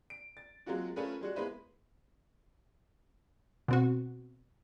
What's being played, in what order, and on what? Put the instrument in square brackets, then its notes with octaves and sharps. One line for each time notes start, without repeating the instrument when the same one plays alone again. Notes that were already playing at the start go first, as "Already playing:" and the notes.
[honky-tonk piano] D7
A6
F#3 G#3 A#3 C4 F4 F#4
A3 C#4 F4 G#4 A#4 B4
G3 G#3 F#4
G#3 A#3 B3 E4 B4 C5
[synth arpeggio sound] B2 C4 F#4